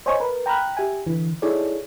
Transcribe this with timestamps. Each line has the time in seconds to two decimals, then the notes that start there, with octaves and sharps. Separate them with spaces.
0.06 C5 C#5 D#5 G#5 C#6
0.20 A#4 B4
0.46 G5 A#5 B5 F6 F#6
0.77 G4 E5 G#5
1.07 D3 E3
1.42 D#4 E4 G#4 A4 C#5 D5